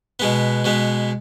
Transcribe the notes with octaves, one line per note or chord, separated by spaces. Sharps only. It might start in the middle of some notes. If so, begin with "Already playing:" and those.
B2 G#3 B3
B2 G#3 B3